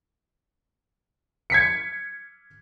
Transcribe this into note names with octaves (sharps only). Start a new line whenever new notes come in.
G#6 B6 C#7